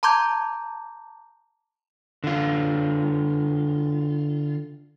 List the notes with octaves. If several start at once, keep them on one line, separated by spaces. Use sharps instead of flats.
A5 A#5 C6 D6 G6 G#6
D3 F4